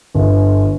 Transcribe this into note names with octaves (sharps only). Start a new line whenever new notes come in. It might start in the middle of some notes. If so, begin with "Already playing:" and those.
G1